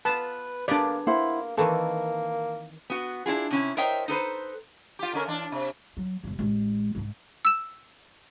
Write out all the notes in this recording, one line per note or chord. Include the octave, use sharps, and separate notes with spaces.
B3 F4 B4 A5
A#3 B3 D4 G4 G#4 D5
A#3 E4 C5 F#5
D#3 E3 A#3 C4 A4
B3 F#4
D4 E4 F4 G#4
C3 C#4 E4
A#4 C5 C#5 D#5 E5 G5
D#4 A4 B4 C5
F4 G4
D3 C#4 A#4
E3 D4
C3
F#3
E1 G2
A1 G#3
G#2 G#3
E6 E7